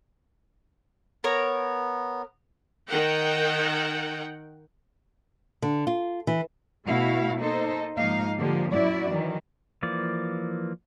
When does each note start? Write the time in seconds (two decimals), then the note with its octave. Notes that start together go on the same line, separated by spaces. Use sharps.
1.24 B3 A#4 C#5 A#5
2.88 D#3 A#4 F#5 G5
5.62 D3
5.87 F4
6.27 E3
6.86 B2 A3 E4 F#4 F5
7.41 A#3 D#4 A4 C5
7.95 G#2 F3 A#3 D#4 F5
8.37 D3 F3 A#3 G4
8.71 F#2 A#2 E4 F#4 D5
9.08 D#3 E3 F#3
9.83 E3 F3 A#3 D5